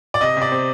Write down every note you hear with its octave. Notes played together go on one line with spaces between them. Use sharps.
D5
C3 D#5
C3 D5
C4